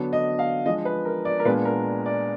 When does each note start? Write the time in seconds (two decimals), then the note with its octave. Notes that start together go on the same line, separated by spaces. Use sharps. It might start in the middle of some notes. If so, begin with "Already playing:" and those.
Already playing: D3 F#3 B3 D4
0.13 D#5
0.39 F5
0.66 F3 G#3 D4 D#5
0.85 B4
1.05 A#4
1.25 D5
1.39 A#4
1.45 A#2 G#3 B3 D4 B4
1.65 A#4
2.06 D5